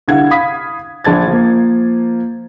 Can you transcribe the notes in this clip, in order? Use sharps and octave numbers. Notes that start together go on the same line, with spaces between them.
C2 D3 F5 F#5 G#6
F5 B5 D#6 B6
A#1 D4 A5 G#6 A6
F3 A#3